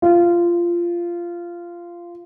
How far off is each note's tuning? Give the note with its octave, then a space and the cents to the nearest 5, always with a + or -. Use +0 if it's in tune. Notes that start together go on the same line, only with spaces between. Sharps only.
F4 -15